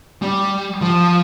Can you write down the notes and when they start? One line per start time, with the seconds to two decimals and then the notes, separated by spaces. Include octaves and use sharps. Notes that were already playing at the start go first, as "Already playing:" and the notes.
0.22 G3
0.81 F3